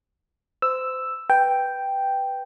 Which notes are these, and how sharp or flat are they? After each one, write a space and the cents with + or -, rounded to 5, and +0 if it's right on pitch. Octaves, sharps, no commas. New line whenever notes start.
C5 -25 E6 +0
B4 +0 G5 +0